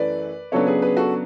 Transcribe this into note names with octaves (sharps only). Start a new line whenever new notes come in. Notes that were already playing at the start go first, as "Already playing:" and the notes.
Already playing: F#2 E3 A3 B4 D5
C#3 F#3 B3 D4 A4 C#5
G#4 B4
G#4 B4
F#4 A4